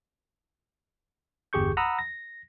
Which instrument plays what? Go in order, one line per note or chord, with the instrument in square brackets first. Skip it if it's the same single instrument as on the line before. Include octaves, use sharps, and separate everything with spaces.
[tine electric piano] G1 E2 G4 G#4 C#6 G6
F#5 A#5 B5 D#6 E6
A#6